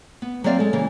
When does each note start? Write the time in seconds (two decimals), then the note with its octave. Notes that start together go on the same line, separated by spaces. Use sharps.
0.22 B3
0.44 F#3 A#3 C4 D5 F5
0.59 G#3 A4
0.73 C#3 E3 A#3